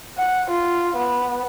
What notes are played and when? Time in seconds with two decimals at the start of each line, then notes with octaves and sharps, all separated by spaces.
0.18 F#5
0.50 F4
0.97 B3